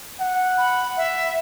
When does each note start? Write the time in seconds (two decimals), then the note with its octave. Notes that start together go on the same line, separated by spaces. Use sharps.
0.20 F#5
0.58 B5
0.97 E5